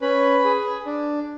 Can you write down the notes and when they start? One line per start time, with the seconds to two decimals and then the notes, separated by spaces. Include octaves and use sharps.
0.02 C#4 B4 B5
0.44 G#4
0.86 D4